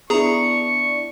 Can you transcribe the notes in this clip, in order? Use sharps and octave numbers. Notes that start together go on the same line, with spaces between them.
B3 D4 E4 G#4 A#5 C#6